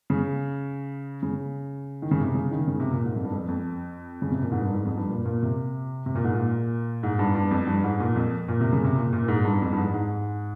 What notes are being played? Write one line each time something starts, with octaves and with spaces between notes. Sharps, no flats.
C#3
C#3
D#3
C#3
C3
C#3
D#3
C#3
C3
A#2
G#2
F2
G2
F2
F2
C#3
C3
A#2
G#2
G2
G#2
F2
G2
A#2
A#2
C3
C3
A#2
G#2
A#2
G#2
G2
G2
F2
G2
G#2
A#2
F2
A#2
C3
C#3
C3
A#2
A#2
A#2
G#2
G2
F2
G2
G#2
G#2